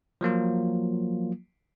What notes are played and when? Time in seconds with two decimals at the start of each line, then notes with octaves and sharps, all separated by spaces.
0.21 F3 F#3 A#3 F4